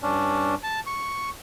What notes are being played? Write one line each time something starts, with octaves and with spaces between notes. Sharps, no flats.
G2 C#4 D4
A5
C#6